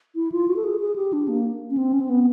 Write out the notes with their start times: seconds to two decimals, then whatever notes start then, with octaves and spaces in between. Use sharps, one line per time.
0.15 E4
0.32 F4
0.48 F#4
0.56 A4
0.64 G#4
0.80 G#4
0.96 G4
1.13 D4
1.28 A#3
1.70 C#4
1.77 C4
1.93 C#4
2.00 C4
2.09 B3